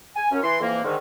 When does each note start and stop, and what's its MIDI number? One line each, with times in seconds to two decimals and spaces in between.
0.16 0.30 80
0.32 0.39 42
0.32 0.39 61
0.43 0.60 52
0.43 0.60 84
0.61 0.83 41
0.61 0.83 52
0.61 0.83 58
0.84 0.96 44
0.84 0.96 50
0.84 0.96 51